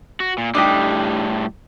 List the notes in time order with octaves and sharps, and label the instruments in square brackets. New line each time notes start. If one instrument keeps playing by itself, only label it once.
[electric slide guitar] F#4
A#2
[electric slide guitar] A2 G3 [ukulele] D4 D#4 G4